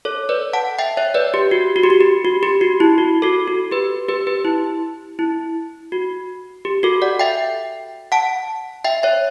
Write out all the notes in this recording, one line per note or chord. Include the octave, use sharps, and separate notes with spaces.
A4 C#5
B4 D5
F#5 A5
E5 G5
C#5 E5
B4 D5
G4
F#4
F#4
G4
F#4
G4
F#4
G4
F#4
E4
F#4
F#4 A4
F#4
G4 B4
G4 B4
G4 B4
E4
E4
F#4
G4
F#4 A4
D5 F#5
E5 G5
F#5 A5
E5 G5
C#5 E5